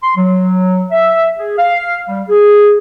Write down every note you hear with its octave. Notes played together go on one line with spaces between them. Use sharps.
C6
F#3
E5
G#4
F5
G3
G#4